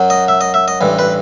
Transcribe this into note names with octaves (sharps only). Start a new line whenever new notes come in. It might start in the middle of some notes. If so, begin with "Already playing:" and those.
Already playing: F#2 F#3
D#5
E5
D#5
E5
D#5
A1 G2 E3
B4